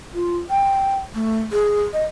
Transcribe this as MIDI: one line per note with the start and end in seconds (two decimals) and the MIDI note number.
0.14 0.37 65
0.50 0.97 79
1.14 1.40 57
1.52 1.82 68
1.93 2.04 75